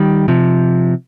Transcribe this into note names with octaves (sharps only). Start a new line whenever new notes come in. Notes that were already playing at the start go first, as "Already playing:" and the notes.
Already playing: D#3 G3
C3 F3